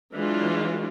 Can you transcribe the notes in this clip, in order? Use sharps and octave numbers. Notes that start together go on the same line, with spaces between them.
E3 F#3 G#3 D4 F4